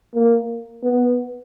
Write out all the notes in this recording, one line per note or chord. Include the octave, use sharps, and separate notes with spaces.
A#3
B3